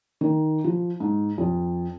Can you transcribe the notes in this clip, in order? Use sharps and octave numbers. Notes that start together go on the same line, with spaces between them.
D#3
F3
G#2
F2